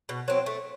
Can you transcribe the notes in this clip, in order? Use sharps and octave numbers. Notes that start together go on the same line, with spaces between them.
B2
F#3 C4
A3